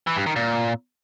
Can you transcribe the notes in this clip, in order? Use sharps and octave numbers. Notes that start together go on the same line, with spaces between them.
E3
G2
D#3
A#2